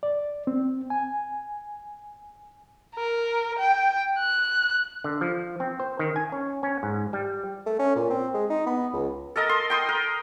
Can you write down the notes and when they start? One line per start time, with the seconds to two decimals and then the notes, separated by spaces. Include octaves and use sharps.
0.03 D5
0.47 C4
0.90 G#5
2.95 A#4
3.59 G5
4.19 F#6
5.04 D3
5.21 F3
5.60 C4
5.80 C5
5.99 D#3
6.16 G#5
6.32 C#4
6.63 C#4
6.83 G#2
7.13 G3
7.66 A3
7.79 C#4
7.96 A#2
8.10 C4
8.34 G#3
8.50 D#4
8.66 B3
8.93 C#2
9.36 A4 A#4 D#5 A5
9.49 C6
9.70 G5 C6 D#6
9.89 A#4